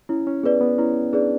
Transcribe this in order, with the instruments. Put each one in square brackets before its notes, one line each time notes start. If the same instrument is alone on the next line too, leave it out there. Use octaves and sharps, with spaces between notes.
[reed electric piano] C#4 [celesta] E4
[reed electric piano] C#4
[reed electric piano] B3 [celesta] G#4 B4 D5
[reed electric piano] B3
[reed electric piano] C#4 [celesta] E4
[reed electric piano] D4 [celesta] G#4 B4 D5